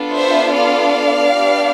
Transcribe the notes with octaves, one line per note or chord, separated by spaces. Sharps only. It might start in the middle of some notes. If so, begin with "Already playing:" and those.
Already playing: B3 D4 F4 A4
C5 E5
D5 F5
B3 D4 G4